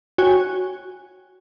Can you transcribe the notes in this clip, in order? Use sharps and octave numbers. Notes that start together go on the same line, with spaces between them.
F#4 C#5 G5 G#5